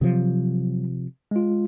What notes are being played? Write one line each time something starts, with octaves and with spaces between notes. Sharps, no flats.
C3 F3 F#3
G#3 F4